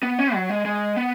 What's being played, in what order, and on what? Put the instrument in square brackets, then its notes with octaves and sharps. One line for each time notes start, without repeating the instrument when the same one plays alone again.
[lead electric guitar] B3
C#4
F#3
G#3
G#3
B3